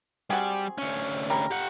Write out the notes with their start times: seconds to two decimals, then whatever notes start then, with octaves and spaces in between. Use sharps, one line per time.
0.30 G3 C4 F#4 G#4
0.78 D2 C#4
1.30 G3 A#4
1.51 G4 F#5